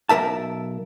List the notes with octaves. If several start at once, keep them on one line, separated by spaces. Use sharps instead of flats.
B1 D#3 A#4 E5 A5